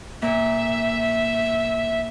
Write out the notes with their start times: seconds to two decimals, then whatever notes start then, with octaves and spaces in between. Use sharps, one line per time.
0.22 A#2 E5